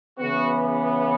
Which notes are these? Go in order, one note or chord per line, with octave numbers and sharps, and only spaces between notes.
C#3 E3 B3 F#4